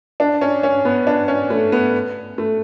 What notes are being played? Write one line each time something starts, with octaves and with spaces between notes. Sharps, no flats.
D4
C#4
C#4
B3
D4
C#4
A3
B3
A3